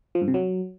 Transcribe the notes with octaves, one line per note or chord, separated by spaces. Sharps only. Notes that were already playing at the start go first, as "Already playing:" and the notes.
F3
G2
C3
F#3